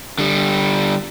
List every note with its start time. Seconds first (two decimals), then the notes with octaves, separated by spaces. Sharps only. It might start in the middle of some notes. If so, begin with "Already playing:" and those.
0.19 D3 G3